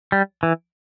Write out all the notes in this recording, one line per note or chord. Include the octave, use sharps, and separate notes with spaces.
G3
E3